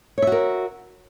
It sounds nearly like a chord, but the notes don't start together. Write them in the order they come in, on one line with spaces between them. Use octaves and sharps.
C#5 E5 F#4 A#4